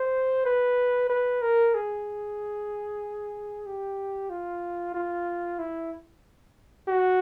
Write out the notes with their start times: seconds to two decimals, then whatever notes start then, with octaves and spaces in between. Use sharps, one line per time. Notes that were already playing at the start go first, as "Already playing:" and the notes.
Already playing: C5
0.46 B4
1.09 B4
1.42 A#4
1.74 G#4
3.66 G4
4.30 F4
4.94 F4
5.59 E4
6.88 F#4